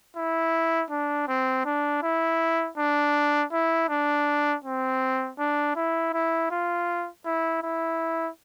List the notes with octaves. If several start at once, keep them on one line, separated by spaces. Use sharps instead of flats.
E4
D4
C4
D4
E4
D4
E4
D4
C4
D4
E4
E4
F4
E4
E4